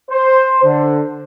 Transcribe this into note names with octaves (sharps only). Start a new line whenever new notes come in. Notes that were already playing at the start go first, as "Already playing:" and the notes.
C5
D3